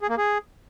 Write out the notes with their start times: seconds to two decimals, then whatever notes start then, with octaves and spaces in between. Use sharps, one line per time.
0.01 G#4
0.09 A#3
0.18 G#4